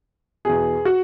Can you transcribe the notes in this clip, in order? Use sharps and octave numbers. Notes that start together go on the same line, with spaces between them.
E2 B2 G#4
F#4